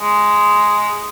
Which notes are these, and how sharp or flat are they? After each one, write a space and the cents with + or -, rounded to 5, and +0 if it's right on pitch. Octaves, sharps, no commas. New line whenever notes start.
G#3 +0